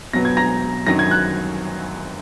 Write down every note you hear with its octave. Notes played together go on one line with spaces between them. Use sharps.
B2 F#3 B3 A#6
G#6
A#5 A#6
F#2 D#3 F#3 A#6
G#6
F#6